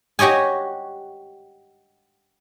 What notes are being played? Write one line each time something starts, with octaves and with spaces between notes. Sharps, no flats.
F#4 G4 C#5 D#5 G#5